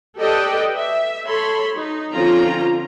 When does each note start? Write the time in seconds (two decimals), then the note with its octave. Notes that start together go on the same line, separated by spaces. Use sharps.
0.18 G4 A4 B4 D5 D#5 G5
0.76 E5
1.26 A4 C#5 B5 C6
1.75 D#4
2.13 D3 F3 C4 C#4 F4 A#5